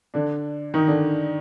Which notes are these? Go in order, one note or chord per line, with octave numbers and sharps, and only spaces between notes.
D3 D4
D#3 D#4
D3 D4